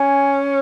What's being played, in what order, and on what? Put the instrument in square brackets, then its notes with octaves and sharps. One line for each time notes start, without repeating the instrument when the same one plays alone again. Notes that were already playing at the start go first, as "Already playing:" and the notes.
Already playing: [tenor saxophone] C#4 [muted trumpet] G#5